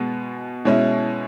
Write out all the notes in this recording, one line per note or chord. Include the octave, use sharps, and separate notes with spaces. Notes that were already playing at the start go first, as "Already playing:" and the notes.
Already playing: B2 G#3 B3
B2 G#3 C#4 E4